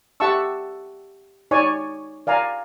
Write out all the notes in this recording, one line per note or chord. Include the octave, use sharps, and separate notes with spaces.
G4 E5 F#5 A5 C#6 E6
D#4 C#5 D5 G#5 C#6
D5 F5 G#5 A#5